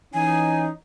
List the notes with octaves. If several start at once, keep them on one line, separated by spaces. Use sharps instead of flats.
E3 C#4 D#4 G#5